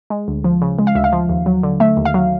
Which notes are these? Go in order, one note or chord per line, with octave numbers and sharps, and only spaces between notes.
G#3
D2
F3
C#3
G#3
F5
D2 E5
F5
F3
D#2
F#3
D3
A3 E5
D#2
F5
F#3